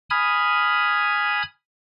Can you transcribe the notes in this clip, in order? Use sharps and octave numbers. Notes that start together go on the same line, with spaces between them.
G#5 B5 D#6 F6 G#6